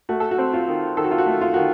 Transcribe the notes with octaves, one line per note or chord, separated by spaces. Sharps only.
A3 F#4
A4
F#4
C4
F4
D#3
D#3 A4
F#4
F4
F#4
A3
F4
D#3 F#4